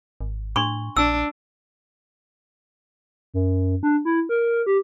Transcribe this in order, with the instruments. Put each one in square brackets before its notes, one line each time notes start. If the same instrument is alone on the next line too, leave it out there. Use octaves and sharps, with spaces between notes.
[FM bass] G#1
[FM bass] A2 [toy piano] D4 C6 C#6
[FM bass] A#1 [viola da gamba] D4 [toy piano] E6
[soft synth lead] F#2
D4
E4
A#4
G4